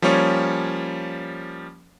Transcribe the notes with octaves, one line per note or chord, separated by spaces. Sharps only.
F3 G3 A#3 C#4 C#5